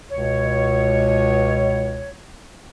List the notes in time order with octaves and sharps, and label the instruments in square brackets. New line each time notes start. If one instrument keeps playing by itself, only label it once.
[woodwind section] C#2 B2 C#5